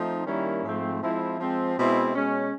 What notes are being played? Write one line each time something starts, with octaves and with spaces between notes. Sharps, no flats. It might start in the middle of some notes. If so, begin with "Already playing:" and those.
Already playing: F3 A3 C4 D#4
D#3 G3 A#3 C#4 E4
G#2 F3 A3 C4
F3 G#3 C4 E4
F3 G#3 C4
B2 G#3 C4 E4
B2 G#3 C#4